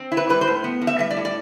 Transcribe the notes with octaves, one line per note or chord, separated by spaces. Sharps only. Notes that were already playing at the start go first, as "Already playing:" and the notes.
Already playing: C4
E4
B4
G3 B4
C5
A2
B3
A2
E5
G3 E5
D5
A2
D5